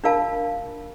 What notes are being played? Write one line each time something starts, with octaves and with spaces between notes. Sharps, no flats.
D4 F4 A#4 F5 A5